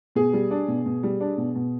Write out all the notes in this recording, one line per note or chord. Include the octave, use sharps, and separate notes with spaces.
B2 G#4
G3
D4
B2
B2
G3
D4
B2
B2